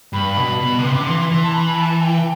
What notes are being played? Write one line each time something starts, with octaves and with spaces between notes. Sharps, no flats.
G2 B5
B2
B2
D3
C3 C6
C3 D6
D3
E3 C6
E3
A5
B5
A5
G5